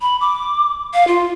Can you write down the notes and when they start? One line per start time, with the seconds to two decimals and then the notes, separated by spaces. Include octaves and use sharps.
0.01 B5
0.21 D6
0.94 F5
1.07 F4